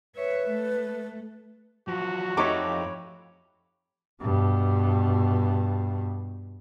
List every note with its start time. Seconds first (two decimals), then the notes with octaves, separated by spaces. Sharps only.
0.16 B4 C#5 E5
0.49 A3
1.88 F3 F#3 F#4
2.37 F2 A3 D#4 G4 C#5 B5 D6
4.21 G2 B2